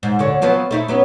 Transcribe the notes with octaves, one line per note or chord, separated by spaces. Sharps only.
G#2
D2 D3 C#5
F3 F#3 B3
A3 D#4 E4
F#3 B3 C#4